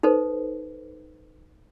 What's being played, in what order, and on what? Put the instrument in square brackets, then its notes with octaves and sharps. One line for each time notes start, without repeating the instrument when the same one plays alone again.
[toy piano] D#4 A4 B4 C5